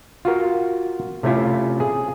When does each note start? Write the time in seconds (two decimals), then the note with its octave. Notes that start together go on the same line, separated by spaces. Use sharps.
0.25 F4 F#4 A#4
1.23 C3 A3 C#4 E4 F4
1.80 G#4